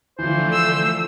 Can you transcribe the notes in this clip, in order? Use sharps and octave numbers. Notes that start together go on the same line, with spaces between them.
D3 E3 F3 A3 C5
E6